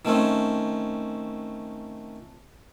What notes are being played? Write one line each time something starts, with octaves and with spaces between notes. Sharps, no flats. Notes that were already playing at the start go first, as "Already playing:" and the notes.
D#3 A3 C4 C#4